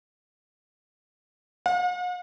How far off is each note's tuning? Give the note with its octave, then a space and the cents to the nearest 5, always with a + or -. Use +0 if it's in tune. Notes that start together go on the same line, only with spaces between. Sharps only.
F#5 -45